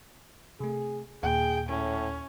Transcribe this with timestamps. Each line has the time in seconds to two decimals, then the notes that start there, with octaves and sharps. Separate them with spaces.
0.60 C3 A3 G#4
1.23 D#2 A#2 G#4 G5
1.69 A2 C#4